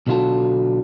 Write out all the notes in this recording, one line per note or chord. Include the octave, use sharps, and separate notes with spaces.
B1 B2 D3 F4 F#4 A4